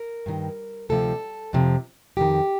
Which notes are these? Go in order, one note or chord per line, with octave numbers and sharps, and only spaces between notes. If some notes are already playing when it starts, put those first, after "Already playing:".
Already playing: A#4
G2 D#3
D2 C3 F3 A4
F2 C3 F3
F2 D#3 G4